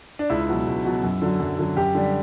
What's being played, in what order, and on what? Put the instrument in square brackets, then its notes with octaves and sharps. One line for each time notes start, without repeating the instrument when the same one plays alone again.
[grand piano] D4
C#2 E4
B2 F#3
C#2
B2 F#3
F#2
D3 F#3
F#2
D3 F#3
F#2 G4
D3 G3